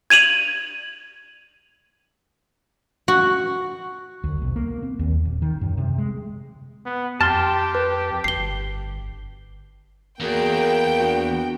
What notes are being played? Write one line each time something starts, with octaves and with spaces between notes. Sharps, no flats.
G#6 D#7 F7 F#7
F#4
D2
B1
A#3
C4
D#2
D#1
D#3
F#2
C3
G#3
B3
F2 G4 A5 C6 F6 A6
B4
G1 C7 G7
E2 A#3 F#4 G#4 A#4 G5
B3 D4 F#4